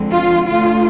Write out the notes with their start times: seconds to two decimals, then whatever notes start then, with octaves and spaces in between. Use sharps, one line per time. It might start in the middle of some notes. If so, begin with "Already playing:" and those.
Already playing: F2 D3 F3 G#3 C4
0.10 F4
0.46 D2 D3 A3 F4